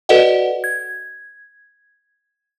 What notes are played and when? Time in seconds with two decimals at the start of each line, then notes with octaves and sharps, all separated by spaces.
0.09 F#4 A4 B4 D5 D#5 F#5
0.64 G#6